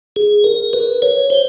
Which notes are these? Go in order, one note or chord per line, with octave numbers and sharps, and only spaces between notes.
G#4
A#4
B4
C#5
C5